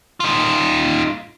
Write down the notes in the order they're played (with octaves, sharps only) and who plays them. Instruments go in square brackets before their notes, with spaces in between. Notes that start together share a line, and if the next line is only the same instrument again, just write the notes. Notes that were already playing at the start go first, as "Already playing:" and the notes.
[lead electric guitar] D#4 F4